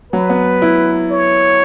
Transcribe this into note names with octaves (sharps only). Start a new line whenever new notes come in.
F#3 B4
B3
E4
C#5